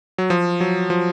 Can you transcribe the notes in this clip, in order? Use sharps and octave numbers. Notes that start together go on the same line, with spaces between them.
F#3
F3
F#3
F3